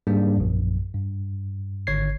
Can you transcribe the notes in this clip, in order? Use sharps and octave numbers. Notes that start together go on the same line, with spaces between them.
G#2 G3 A#3 D4 G#4
A#1 F#2
G2
G#1 D3 C#5 G#6 C7